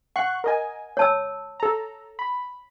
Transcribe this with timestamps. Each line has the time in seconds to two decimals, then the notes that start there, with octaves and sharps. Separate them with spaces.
0.16 F#5 C#6 F#6
0.44 A#4 D#5 G#5
0.97 C#5 A5 E6
1.60 A4 A#5
2.19 B5